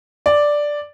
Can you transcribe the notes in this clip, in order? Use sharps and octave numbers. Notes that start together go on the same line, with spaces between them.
D5